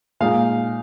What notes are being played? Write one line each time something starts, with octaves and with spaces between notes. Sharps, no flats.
A#2 G#3 D#4 F5